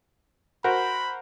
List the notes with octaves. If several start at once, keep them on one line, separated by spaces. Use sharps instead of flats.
F#4 A#4 C5 B5